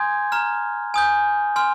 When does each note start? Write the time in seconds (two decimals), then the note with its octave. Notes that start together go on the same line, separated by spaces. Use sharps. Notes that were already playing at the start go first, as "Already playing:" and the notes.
Already playing: G#5 C6 D#6 G6 G#6
0.32 A#5 F6
0.94 G#5 D#6 G6
1.56 G#5 C6 F6